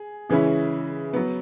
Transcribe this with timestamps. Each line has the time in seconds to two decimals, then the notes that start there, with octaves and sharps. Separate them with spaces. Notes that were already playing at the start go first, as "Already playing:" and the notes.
Already playing: G#4
0.30 C#3 E3 G#3 C#4 E4
1.13 F#3 B3